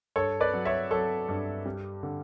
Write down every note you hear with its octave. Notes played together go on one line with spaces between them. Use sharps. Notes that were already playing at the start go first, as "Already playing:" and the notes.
G2 A4 C#5
B4 D5
F#3
C#5 E5
F#3 A4 C#5
G2
G3
D3